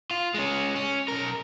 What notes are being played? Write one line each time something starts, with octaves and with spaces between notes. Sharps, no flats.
F4
G#3 C#4
C#4
B1 A#4